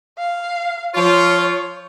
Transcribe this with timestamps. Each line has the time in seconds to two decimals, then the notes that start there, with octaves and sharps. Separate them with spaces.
0.18 F5
0.95 F3 F4 C#5